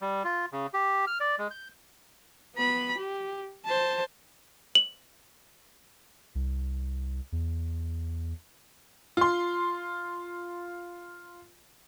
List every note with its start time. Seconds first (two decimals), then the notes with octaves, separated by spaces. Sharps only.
0.02 G3
0.24 F4
0.52 C#3
0.74 G4
1.07 F6
1.20 D5
1.38 G#3
1.51 G6
2.56 B3 B5
2.98 G4
3.65 C5 A5
4.75 F#7
6.35 C2
7.32 E2
9.17 F4 C6